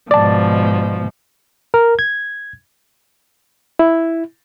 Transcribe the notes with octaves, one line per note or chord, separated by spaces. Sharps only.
G#2 B2 F3 D5 A5
A#4
G#6
E4